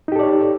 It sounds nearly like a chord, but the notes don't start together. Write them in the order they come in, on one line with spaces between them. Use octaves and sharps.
D#4 G4 A4 D5 C#5